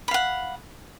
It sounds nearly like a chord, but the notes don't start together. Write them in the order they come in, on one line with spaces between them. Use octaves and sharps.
B5 F5 F#5